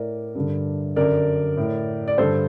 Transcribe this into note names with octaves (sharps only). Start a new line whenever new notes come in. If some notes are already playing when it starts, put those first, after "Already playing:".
Already playing: A2 A#4 D5
G2 D3
F#2 D3 A#4 D5
A2
D5
G2 D3 A4 C5